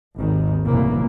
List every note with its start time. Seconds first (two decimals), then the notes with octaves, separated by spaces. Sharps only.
0.18 G#1 D#2 D#3
0.66 F1 C2 A#2 C#3 E3 A#3